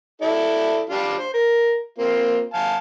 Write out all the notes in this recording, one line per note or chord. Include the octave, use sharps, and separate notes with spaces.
E4 A4 D5
G3 D4 F4
C5
A#4
A#3 C4 F4
F5 G#5 A5